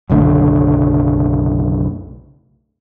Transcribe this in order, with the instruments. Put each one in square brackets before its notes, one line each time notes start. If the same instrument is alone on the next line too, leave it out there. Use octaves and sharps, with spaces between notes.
[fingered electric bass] F#1 B1 D3 A3